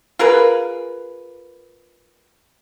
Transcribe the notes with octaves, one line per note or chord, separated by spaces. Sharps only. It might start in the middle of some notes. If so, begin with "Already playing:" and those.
F4 G#4 A#4 B4